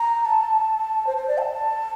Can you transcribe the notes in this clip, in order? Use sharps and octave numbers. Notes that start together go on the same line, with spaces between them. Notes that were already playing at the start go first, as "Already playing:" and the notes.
Already playing: A#5
A5
C5
C5
D5
A5